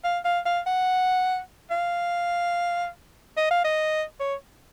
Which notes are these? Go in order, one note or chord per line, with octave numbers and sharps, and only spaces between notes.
F5
F5
F5
F#5
F5
D#5
F5
D#5
C#5